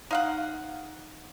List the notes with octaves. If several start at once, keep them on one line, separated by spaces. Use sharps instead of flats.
D#4 F5 F#5